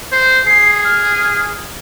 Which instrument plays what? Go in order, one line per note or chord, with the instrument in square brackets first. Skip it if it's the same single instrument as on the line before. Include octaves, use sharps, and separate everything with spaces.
[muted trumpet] C5
[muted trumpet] G#4 [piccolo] C7
[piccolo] F6